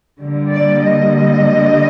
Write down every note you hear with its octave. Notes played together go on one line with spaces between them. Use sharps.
D3 G3 A#3
D5
D#5